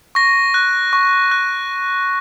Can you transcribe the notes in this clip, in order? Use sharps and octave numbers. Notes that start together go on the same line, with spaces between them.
C#6 A#6
F#6
C#6
F#6